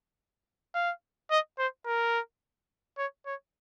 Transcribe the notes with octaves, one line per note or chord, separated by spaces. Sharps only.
F5
D#5
C5
A#4
C#5
C#5